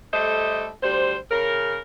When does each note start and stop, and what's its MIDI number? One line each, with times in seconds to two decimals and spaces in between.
0.13 0.69 55
0.13 0.69 57
0.13 0.69 69
0.13 0.69 72
0.13 0.69 75
0.83 1.16 38
0.83 1.16 55
0.83 1.16 72
1.31 1.78 49
1.31 1.78 70